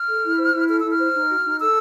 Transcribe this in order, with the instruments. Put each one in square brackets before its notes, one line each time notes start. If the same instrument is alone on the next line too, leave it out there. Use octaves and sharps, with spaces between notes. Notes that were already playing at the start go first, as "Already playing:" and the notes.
Already playing: [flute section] F6
A4
E4
C5
E4
A4 F6
E4 E6
F6
C5
D#4
F#4
D#4
A4 E6